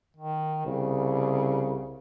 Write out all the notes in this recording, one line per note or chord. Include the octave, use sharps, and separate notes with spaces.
D#3
C2 C#3